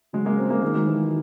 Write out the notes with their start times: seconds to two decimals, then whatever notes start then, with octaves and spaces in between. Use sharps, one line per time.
0.13 C#3 F#3 G#3
0.25 G#3 A#3
0.38 A#3 C4
0.50 G#3 A#3
0.62 D#3 G#3 A#3
0.74 F#3 G#3
0.86 E3 F#3